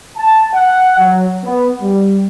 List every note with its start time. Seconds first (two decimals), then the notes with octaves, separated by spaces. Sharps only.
0.17 A5
0.53 F#5
0.98 F#3
1.44 B3
1.81 G3